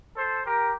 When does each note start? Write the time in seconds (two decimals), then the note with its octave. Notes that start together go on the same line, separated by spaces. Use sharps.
0.15 A4 C5
0.45 G4 A#4